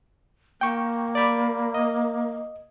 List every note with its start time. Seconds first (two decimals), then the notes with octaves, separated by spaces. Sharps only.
0.61 A#3 G5 C#6
1.15 D5 B5
1.74 D#5